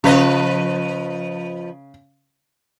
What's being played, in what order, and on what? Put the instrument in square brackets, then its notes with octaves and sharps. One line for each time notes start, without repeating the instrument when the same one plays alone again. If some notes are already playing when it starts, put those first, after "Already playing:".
[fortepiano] C#3 [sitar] F3 B4 D#5